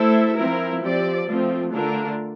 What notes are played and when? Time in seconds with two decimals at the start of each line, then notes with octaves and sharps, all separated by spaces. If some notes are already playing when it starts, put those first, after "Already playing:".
Already playing: A3 E4 A4 C5 E5
0.37 F3 C4 E4 A#4
0.82 F3 C4 G4 D5
1.27 F3 A3 C4 F4
1.72 D3 A3 D4 F4 A#4